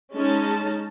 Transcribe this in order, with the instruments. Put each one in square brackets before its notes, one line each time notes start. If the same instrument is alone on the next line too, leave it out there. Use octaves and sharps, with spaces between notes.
[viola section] G#3 C#4 D#4 A5